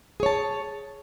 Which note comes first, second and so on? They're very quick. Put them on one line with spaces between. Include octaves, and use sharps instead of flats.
G#4 C#5 A5